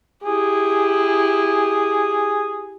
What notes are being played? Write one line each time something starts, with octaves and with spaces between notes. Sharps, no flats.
E4 G4 G#4